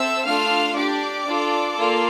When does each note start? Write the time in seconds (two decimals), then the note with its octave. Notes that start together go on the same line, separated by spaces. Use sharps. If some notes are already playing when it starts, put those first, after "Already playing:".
Already playing: C4 A4 E5 E6
0.25 A3 D4 F4 A4 F5 F6
0.75 D4 G4 D5 D6
1.26 D4 F4 A4
1.76 A#3 F4 A4